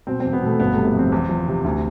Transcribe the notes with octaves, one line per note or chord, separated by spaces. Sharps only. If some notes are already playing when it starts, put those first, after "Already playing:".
B2 C4
C4
E2
B3
B2 A3
G1 B3
C3 A3
B3
F2 C4
E2
F3
C3
D2